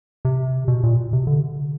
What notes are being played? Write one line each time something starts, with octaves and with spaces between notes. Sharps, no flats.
C3
B2
A#2
C3
D3